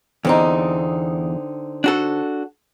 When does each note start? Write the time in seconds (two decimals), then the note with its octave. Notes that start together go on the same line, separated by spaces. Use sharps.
0.25 E2 D3 C4 D#4
1.84 D4 F#4 A4